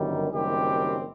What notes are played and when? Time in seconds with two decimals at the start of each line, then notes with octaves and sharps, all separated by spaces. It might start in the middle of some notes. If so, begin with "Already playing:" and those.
Already playing: G1 F#2 D#3 G3
0.31 F#1 F#2 D#3 G3 C4 G4